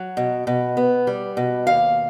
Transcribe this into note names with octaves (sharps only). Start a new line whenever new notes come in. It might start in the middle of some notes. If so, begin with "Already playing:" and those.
Already playing: F#3
B2
B2
B3
G3
B2
D#2 F5